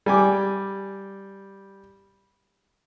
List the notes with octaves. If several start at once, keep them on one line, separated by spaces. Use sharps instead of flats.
G3 G#5 D6